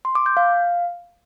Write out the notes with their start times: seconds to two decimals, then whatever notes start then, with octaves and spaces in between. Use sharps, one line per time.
0.05 C6
0.15 D6
0.26 G6
0.37 F5